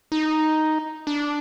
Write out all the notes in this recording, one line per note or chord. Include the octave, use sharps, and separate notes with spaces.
D#4
D4